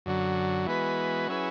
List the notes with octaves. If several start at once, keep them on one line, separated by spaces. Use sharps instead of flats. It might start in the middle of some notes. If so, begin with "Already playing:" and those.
F#2 D3 F#3
E3 G#3 B3 F#4 B4
F#3 C#4 E4 G#4 B4